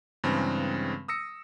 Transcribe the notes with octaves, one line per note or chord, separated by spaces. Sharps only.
G2 C#3 E3 G#3 C4
D#6 E6 A#6 C#7